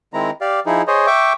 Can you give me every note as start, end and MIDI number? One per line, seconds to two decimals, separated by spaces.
0.13 0.31 51
0.13 0.31 56
0.13 0.31 60
0.13 0.31 64
0.13 0.31 82
0.41 0.60 67
0.41 0.60 74
0.41 0.60 77
0.66 0.82 53
0.66 0.82 63
0.66 0.82 64
0.66 0.82 68
0.87 1.06 68
0.87 1.06 72
0.87 1.06 73
0.87 1.06 75
1.07 1.33 76
1.07 1.33 79
1.07 1.33 85
1.07 1.33 86